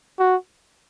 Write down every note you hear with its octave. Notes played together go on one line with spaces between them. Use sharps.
F#4